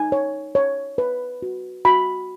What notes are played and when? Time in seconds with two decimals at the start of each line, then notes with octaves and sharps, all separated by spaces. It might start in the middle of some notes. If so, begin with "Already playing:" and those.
Already playing: D#4 G#5
0.12 C#5
0.55 C#5
0.98 B4
1.42 F#4
1.85 F#4 B5